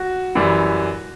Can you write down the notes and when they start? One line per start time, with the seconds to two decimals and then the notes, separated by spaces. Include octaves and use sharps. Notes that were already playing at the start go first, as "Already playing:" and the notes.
Already playing: F#4
0.35 F#2 E3 G3